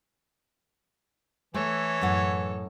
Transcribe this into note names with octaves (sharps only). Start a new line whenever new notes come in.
E3 A3 A4 C#5
F#2 A2 F#5